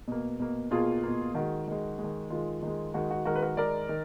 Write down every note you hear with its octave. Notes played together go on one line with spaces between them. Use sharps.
B2 A#3
B2 A#3
B2 A#3 F4 G#4
B2 A#3
D#3 G#3 F#4
D#3 G#3
G#3
D#3
D#3 G#3 F4
D#3 G#3
D#3 G#3 F#4
F#4
D#3 G#3 F#4 A#4
B4
F#4 A#4
D#3 G#3 A#4 D5
D#3